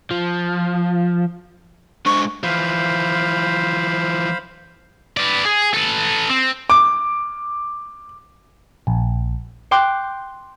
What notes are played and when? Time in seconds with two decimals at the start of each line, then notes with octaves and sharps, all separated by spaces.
0.11 F3
2.06 G#3 D4 C5 C#6
2.43 E3 F3 C5 F5 B5
5.17 B4 D5
5.45 G#4
5.74 A4 B4
6.29 C4
6.70 D6
8.87 A#1
9.71 G5 C6 D6 F#6